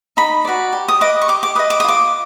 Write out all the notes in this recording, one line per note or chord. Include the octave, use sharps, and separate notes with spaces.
D#4 B5
F#4 B4 D5
G4
D#6
B4 D#5 D6
C#6
G4 D6
D6
B4 D#5 D#6
D6
D#6
F4 D6